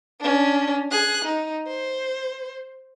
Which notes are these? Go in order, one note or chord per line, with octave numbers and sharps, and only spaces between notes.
C#4 D4
G#4 F#6
D#4
C5